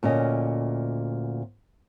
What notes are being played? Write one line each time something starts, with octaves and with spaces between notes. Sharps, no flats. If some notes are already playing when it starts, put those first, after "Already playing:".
D2 A#2 C#4 D#5